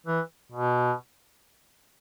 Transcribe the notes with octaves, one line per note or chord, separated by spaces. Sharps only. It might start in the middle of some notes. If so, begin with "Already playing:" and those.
E3
B2